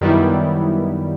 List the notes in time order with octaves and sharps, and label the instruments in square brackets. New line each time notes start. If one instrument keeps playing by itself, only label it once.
[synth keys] F#2 D#3 G3 B3 E4